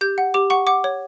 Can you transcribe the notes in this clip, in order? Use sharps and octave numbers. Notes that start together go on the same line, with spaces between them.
G4 G6
F#5
G4 D6
F#5 C#6
F#5 D6
C#5